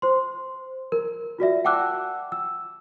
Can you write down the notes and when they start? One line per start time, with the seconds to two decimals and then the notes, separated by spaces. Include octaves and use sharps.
0.02 C5 C6
0.92 A#4
1.38 F4 F#4 D5 E5
1.64 F#5 G5 A5 D6 E6 F#6
2.32 E6